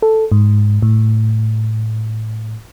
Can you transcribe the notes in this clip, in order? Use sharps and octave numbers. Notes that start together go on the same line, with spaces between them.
A4
G#2
A2